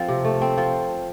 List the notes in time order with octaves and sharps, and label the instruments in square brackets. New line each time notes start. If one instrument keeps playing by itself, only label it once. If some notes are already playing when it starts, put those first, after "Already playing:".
Already playing: [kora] F3 C4 A4
C3
A3
C4
F3